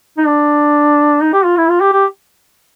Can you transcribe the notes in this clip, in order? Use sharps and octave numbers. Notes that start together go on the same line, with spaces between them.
D#4
D4
D#4
G4
F4
E4
F4
G4
G4